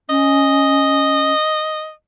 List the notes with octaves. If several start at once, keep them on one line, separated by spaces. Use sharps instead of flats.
C#4 D#5